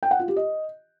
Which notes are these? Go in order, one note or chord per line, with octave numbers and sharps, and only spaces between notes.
G5
F#5
F4
G4
D#5